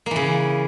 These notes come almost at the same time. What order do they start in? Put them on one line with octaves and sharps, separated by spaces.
A#3 E3 C#3